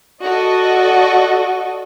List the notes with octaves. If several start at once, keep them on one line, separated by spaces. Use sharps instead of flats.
F#4 A4 D5 D#5